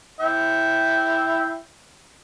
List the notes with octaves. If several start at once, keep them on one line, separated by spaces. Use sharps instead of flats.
E4 E5 G5